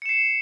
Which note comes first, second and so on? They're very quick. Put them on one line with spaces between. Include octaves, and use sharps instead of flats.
C#7 E7 C7